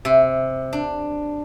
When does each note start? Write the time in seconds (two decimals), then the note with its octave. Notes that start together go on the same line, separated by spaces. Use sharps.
0.05 C3
0.73 D4